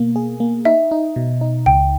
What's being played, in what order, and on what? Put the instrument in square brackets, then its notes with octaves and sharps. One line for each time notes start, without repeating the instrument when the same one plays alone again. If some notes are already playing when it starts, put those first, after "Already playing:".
Already playing: [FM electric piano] B2 A#3
G#4
A#3
[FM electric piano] D#4 [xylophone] E5
[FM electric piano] D#4
B2
D#4
[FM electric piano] C#2 [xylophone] G5